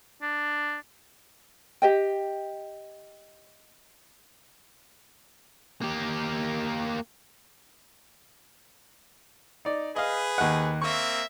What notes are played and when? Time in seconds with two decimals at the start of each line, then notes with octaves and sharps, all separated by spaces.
0.22 D4
1.82 G4 D#5 G5
5.82 A#3 G4
9.65 D#4 D5
9.96 G#4 B4 D#5 F5
10.38 D#2 F#5
10.82 A#3 C4 E5 C#6